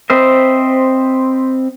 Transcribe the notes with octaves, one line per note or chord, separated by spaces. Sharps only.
C4 B4 C5 D#5 E5